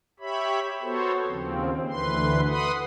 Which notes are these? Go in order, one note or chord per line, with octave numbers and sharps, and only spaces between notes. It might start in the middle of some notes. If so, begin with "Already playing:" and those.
G4 C#5 E5 B5
B3 F#4 A4 C5 C#5
D#2 C#3 F3 C4
D2 D3 E3 B4 C6
B4 F#5 B5 C6 D#6